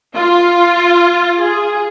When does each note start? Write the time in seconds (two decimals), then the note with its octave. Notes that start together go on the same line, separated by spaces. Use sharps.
0.15 F4
1.40 G#4